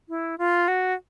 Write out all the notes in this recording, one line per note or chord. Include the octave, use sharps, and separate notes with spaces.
E4
F4
F#4